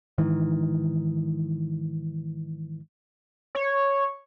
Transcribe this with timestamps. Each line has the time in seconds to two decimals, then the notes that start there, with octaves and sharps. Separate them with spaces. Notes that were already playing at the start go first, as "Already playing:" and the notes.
0.18 G#2 D#3 E3
3.55 C#5